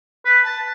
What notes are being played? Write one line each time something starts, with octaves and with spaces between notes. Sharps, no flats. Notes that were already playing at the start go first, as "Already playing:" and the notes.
B4
A5